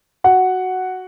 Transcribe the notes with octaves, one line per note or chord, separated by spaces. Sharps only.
F#4 F#5